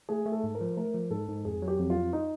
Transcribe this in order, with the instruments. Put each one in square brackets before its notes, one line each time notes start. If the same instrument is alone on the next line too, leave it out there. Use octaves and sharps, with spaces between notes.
[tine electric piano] A3 [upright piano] G#4
[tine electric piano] A3
[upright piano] A4
[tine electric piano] G#2
[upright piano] A#4
[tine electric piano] F3
[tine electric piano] A3 [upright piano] A#4
[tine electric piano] F3
[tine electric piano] G#2 [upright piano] A4
[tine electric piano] G#2
[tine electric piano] F2 [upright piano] G#4
[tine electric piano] F#3
[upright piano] G4
[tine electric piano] F2
[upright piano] F4
[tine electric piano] F2
[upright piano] D#4